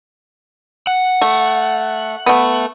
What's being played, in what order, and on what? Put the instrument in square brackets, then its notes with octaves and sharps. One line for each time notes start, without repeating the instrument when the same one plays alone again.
[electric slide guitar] F#5
[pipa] A3
A3 B3